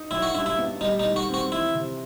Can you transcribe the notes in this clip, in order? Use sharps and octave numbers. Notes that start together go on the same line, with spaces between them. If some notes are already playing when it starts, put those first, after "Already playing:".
Already playing: D#4
F#3 E4
F#4
G2 E4
E4
B3
G3 D#4
D#4
D#3
F#4
C4
F#4
E3 E4
C3